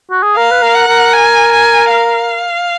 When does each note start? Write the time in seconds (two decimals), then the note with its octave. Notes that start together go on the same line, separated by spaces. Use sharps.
0.10 F#4
0.23 G#4
0.36 A#4 F5
0.51 B4
0.62 A#4
0.75 F#5
0.88 A#4
1.13 G#5
1.52 G#5
1.90 F5